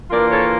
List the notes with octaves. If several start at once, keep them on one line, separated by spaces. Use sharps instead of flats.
E3 A#3 D4 F4 A#4 D5
A4 C#5